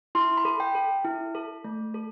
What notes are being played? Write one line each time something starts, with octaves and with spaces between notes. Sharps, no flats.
E4 C6
B5
A4
G5
A4
E4
A4
A3
A4